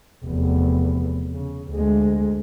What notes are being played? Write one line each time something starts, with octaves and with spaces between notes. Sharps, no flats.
F1 E2
C#3
D2 G#3